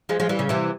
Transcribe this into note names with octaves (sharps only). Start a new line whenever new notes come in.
F3 G#3
F3 G#3
E3 G3
C#3
C3 E3